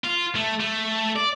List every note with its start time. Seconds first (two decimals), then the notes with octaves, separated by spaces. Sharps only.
0.04 F4
0.35 A3
0.60 A3
1.16 D5